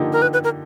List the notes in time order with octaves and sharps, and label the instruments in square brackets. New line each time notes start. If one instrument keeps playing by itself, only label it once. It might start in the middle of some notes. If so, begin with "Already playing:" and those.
Already playing: [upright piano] D3 F3 A#3 D#4 G4
[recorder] A#4
B4
B4
A#4